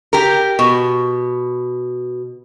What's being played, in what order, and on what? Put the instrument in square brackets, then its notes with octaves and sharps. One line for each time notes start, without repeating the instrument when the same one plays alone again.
[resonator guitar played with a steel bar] G4 A#4
B2